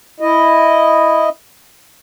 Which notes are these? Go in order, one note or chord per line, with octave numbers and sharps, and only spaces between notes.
E4 D#5